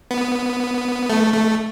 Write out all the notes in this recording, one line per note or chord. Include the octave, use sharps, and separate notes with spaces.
B3
A3
A3